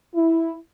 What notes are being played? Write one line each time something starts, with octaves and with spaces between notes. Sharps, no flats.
E4